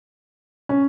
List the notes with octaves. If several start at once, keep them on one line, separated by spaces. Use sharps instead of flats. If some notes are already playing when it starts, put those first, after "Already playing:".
C#4